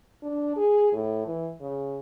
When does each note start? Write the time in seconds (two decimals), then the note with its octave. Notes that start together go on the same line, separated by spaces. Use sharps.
0.22 D4
0.57 G#4
0.93 A2
1.26 E3
1.60 C#3